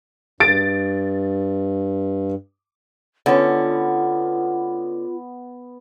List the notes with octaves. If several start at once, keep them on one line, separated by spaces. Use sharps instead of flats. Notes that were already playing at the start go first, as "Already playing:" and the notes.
G2 A6 D7
D3 B3 C#4 F4